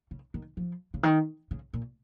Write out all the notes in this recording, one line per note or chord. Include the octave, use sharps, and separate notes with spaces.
C#3
D#3
F3
C#3
D#3
C#3
A#2